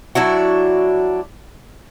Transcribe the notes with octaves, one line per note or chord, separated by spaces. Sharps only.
F#3 D4 E4 F#4